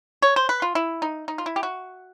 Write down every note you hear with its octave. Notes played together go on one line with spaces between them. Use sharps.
C#5
C5
B4
F4
E4
D#4
D#4
F4
E4
G4
F#4